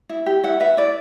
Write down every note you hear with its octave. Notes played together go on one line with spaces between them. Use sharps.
E4
G4
E4 F#5
B4 E5
E4 D5